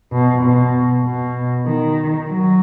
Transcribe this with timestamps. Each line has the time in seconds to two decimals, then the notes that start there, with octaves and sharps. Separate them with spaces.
0.12 B2
0.43 B2
1.04 B2
1.66 D#3
2.28 F#3